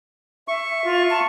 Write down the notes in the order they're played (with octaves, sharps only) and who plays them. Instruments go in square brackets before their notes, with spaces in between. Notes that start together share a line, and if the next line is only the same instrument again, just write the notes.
[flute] E5 [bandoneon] C#6
[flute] F4
A5